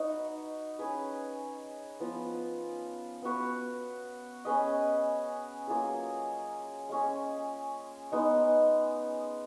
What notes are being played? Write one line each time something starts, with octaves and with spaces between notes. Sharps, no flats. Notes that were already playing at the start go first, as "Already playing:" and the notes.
Already playing: D#4 F#4 B4
C#4 G#4 B4
F3 B3 F4
B3 F#4 B4
C#4 G#4 B4 D#5
F#3 A#3 F4 G#4
G#3 C#4 G#4
G#3 B3 D#4